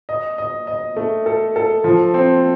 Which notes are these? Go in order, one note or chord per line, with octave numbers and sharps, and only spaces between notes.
D#5
D#5
D#5
A3
A4
A4
F3
C4